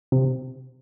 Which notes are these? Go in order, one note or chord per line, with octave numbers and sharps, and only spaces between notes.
C3